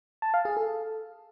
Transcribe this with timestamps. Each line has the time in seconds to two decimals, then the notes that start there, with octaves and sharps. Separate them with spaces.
0.22 A5
0.34 F5
0.45 G#4
0.57 A4